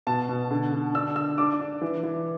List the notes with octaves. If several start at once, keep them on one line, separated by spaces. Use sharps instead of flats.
B2 A5
B2
D3
D3
D4 E6
D4 E6
D4 D6
D4
E3
E3